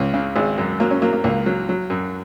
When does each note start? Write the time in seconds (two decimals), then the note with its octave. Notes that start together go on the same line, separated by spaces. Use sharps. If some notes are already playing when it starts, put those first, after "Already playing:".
Already playing: C#2 C#4
0.14 C#3
0.36 G#1 G#3
0.58 F#2
0.80 F#3 A#3
0.91 C#4
1.02 F#3 A#3
1.13 A#3
1.24 C#2 A#3
1.46 F#3
1.69 F#3
1.90 F#2